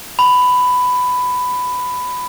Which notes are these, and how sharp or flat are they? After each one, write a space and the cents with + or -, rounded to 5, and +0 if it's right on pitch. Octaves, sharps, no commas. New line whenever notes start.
B5 +10